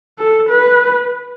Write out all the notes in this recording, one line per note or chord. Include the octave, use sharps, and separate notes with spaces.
A4
B4